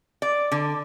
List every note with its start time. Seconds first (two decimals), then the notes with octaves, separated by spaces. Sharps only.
0.22 D5
0.52 D3